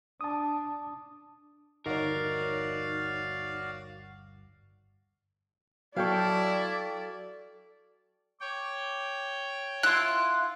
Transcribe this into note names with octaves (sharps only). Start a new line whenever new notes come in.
D4 A5 D#6
G1 D#2 D#4 F#4 A#4 C#5 D5 F5
F#3 E4 A4 D5 F5 G5 C#6
C#5 G5 D6
E4 F4 F#5 F#6